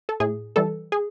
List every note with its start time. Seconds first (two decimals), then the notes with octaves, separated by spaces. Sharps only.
0.09 A4
0.20 A2 G#4
0.56 E3 G3 A4
0.92 G#4